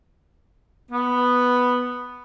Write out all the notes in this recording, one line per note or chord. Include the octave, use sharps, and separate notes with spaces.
B3